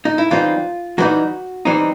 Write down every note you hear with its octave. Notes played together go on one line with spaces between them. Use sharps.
D#4
E4
E3 G3 C4 D#4 F4
E3 G3 C4 D#4 F#4
E3 G3 C4 D#4